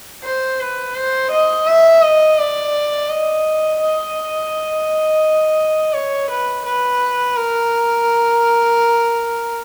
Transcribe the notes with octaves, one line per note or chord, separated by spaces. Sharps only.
C5
B4
C5
D#5
E5
D#5
D5
D#5
D#5
C#5
B4
B4
A#4